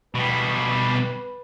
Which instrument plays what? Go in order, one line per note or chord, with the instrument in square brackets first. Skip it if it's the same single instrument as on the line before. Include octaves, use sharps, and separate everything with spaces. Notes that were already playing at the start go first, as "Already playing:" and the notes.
[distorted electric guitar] B2 G3 [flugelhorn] B4